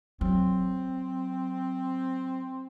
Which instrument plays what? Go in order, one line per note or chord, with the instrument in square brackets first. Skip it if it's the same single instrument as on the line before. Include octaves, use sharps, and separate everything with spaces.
[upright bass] F#3 [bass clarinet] C4